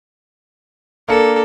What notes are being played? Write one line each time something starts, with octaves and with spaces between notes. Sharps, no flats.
A#3 D4 A4 C#7